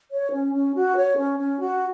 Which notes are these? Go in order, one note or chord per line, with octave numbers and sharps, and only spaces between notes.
C#5
C#4
C#4
F#4
C#5
C#4
C#4
F#4